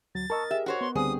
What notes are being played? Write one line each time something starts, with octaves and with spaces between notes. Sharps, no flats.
D2 F#3 A6
A#4 D#5 A5 C#6 E6
G4 G#4 E5
F#4 C5 C#5
B3 C6
C#2 D3 G3 B3 C4 G#4 D#6